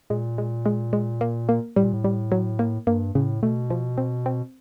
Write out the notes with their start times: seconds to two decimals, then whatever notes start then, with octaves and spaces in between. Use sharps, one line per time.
0.10 A#2 G#3
0.38 G#3
0.66 G#3
0.93 G#3
1.21 A#3
1.49 A#3
1.76 A2 G3
1.84 A#2
1.93 A2
2.04 G3
2.32 F#3
2.59 A#3
2.87 G2 A#3
3.15 A2 C#3
3.42 B2 A3
3.70 F3
3.98 C4
4.26 C4